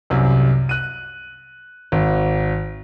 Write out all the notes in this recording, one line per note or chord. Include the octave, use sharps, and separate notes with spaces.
C2 F#2
F#6 D#7
G#1